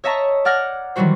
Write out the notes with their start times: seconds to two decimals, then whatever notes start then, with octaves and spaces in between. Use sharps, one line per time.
0.04 C#5 D#5 E5 A5 A#5 C#6
0.45 D5 F#5 F6 G#6 A#6
0.96 D#3 E3 F#3 G3 F#4 C5